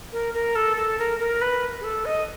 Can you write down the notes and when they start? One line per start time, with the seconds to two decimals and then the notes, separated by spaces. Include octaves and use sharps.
0.12 A#4
0.34 A#4
0.55 A4
0.77 A4
0.98 A#4
1.20 A#4
1.42 B4
1.80 G#4
1.84 A4
2.05 D#5